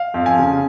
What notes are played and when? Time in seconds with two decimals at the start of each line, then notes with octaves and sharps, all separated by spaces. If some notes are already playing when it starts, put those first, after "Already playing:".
Already playing: F5
0.14 F2
0.26 G#5
0.39 C#3